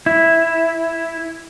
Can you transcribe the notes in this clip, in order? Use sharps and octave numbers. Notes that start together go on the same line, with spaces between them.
E4